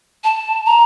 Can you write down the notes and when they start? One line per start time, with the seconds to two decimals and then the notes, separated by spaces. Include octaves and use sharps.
0.24 A5
0.66 A#5